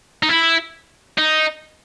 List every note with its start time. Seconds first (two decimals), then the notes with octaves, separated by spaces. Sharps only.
0.23 D#4
0.29 E4
1.18 D#4